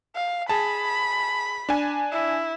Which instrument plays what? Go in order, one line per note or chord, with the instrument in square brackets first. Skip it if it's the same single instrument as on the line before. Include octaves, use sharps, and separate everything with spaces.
[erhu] F5
[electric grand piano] G#4 A5 [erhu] B5
[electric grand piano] D4 G#5
[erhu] E4